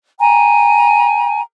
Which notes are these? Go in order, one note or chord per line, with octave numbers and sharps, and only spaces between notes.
G5 G#5 A#5